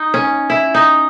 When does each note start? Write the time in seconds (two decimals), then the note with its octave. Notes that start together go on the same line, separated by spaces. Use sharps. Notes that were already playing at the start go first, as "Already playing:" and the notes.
Already playing: D#4
0.14 C#4
0.50 E4
0.74 D#4